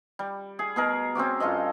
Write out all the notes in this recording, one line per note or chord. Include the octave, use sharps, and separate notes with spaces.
G3
G#4
B2 G#4 A#4
C4 C#4 F#4 D6
G2 F4 A4 D#5